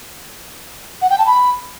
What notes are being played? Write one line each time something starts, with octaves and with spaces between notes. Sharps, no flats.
F#5
G5
A5
B5